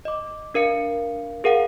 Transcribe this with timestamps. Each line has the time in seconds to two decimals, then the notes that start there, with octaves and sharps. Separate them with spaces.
0.05 D#5 D6
0.54 D4 A#4 F5 C#7
1.44 G#4 A#4 F5 F#5